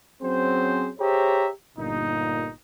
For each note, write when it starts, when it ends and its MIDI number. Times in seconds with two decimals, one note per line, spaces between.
0.22 0.89 54
0.22 0.89 60
0.22 0.89 61
0.22 0.89 68
0.22 0.89 72
0.99 1.48 67
0.99 1.48 68
0.99 1.48 72
0.99 1.48 73
0.99 1.48 76
0.99 1.48 82
1.77 2.49 31
1.77 2.49 46
1.77 2.49 63